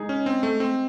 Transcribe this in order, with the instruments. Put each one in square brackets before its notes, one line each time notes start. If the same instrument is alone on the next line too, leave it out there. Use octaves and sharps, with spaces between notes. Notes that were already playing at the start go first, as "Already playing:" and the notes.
Already playing: [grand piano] G#3 D#4 G#4
[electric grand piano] C#4
C4
A3
C4